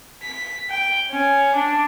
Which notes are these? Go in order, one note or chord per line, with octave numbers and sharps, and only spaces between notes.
B6
G5
C#4
D4